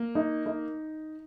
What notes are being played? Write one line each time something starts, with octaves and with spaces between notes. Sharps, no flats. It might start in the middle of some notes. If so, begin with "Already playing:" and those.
Already playing: A#3
D#4
D#4